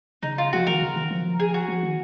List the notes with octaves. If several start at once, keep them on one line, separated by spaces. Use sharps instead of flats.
C#3 D#4
F4
F3 F#4
D#3 A#4
C#3
D#3
F3
G#4
F#4
F3
D#3